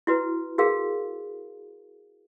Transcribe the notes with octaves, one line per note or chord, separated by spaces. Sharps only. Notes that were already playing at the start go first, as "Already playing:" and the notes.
E4 F#4 B4
F#4 G#4 A#4 F5